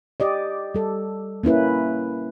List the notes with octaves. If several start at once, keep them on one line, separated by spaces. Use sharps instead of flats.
G4 D5 D#5
G3 A4
A#3 C#4 E4 B4